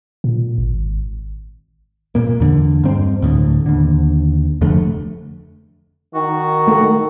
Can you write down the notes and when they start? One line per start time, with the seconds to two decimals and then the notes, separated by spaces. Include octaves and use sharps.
0.24 A#2
0.58 G#1
2.15 A#2 A#3
2.40 E2 D3
2.84 G2 C4
3.22 D2 A2 D3
3.66 D#2 D3
4.61 F1 F2 D3 A3
6.15 D#3 F#4
6.68 A3 A4